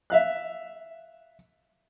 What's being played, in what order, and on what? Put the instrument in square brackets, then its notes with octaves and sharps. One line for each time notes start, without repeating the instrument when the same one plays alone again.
[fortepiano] E5 F5 F#6